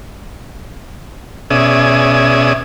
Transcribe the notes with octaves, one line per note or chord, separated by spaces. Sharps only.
B2 C#4 G#4 D5 E5 D#6